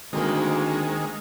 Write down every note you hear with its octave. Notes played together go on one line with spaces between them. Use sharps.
D2 D#3 G#3 A#3 C4